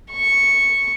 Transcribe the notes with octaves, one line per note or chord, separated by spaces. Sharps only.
C#6